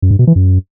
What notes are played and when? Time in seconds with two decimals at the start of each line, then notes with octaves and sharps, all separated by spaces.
0.02 F#2
0.11 G2
0.19 B2
0.27 E3
0.36 F#2